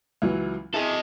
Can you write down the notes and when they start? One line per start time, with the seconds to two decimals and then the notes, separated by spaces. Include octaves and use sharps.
0.22 C#2 E3 F#3
0.74 E4 G#4 A4 D#5